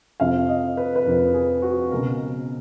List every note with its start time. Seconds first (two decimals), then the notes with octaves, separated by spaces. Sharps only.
0.20 F1 F2 F3 F5
0.49 D#5
0.77 B4
0.95 B4
1.06 F1 F2 F3 A#4
1.34 G#4
1.62 F#4
1.91 C#2 B2 A#4